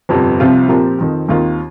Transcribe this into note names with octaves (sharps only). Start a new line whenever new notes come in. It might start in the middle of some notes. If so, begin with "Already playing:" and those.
G1 F2 C3 G3
C2 C3 F3 C4 F4
A#2 F3 C4 G4 A#4
F2 D#3 C4
D#2 D#3 C4 F4 A#4